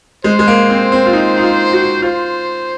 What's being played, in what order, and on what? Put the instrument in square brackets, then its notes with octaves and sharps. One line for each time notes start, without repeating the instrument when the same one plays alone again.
[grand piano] G#3 [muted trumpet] C5
[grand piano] G#3
A#3
C4
C4
F4
D#4
D#4
F4
F#4
[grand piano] F4 [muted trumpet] C5